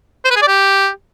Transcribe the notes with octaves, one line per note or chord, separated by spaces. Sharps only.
C5
B4
G#4
D5
G4